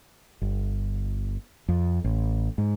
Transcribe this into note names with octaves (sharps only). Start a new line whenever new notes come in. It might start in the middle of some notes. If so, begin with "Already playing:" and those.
G1
F2
A1
G#2